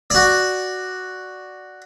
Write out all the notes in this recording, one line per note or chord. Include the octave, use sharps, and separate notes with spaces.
F#4 D5